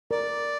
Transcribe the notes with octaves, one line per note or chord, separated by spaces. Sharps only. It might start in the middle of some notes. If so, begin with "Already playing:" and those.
A#4 D5